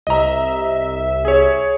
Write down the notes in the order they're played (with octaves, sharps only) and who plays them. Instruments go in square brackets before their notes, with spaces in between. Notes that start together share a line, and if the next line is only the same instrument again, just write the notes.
[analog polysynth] C2 E5 [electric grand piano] D#5 A#5
[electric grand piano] G#4 C#5